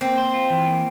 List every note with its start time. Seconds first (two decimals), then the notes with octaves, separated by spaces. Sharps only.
0.01 A#3 C4
0.18 C5
0.34 F4
0.50 E3
0.66 A#3